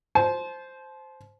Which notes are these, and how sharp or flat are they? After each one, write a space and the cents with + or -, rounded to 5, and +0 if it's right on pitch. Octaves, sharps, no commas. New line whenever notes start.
C5 +0 A5 -35